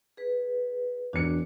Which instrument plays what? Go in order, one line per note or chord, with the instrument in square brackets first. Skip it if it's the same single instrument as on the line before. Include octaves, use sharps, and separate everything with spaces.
[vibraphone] G#4 B4
[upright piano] E1 C#7 [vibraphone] D4 F#4